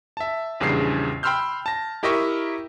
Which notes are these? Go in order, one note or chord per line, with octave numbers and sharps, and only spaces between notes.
E5 A5
A#1 E2 C#3 G3 D4 C7
G5 B5 C6 E6 F6 G6
A5 A#6
E4 G4 A#4 D#5 E5 C#6